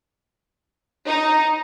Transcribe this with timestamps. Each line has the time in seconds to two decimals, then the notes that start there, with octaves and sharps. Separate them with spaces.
1.07 D#4